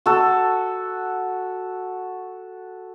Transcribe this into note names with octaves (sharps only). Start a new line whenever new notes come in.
F#4 A4